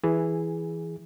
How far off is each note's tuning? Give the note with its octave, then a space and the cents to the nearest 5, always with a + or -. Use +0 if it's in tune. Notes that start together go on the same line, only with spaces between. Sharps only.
E3 +0 G#4 +0